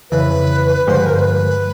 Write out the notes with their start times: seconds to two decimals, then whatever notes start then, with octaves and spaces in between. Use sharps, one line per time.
0.11 F2 C#3 E3 B4
0.87 G2 D3 F3 G#3 C5
0.96 B4
1.06 A#4
1.15 C5
1.20 B4